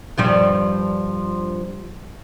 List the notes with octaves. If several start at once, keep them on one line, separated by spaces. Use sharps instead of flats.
G2 F3 G3